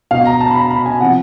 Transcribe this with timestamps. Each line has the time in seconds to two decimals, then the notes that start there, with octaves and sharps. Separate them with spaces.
0.11 B2 F5
0.25 A#5
0.41 A5
0.51 B5
0.55 A#5
0.70 B5
0.86 G#5
1.00 C3 F3 F#5